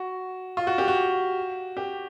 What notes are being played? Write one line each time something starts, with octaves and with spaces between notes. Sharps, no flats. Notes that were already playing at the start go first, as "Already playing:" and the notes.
Already playing: F#4
F4
F#4
G4
F#4
G4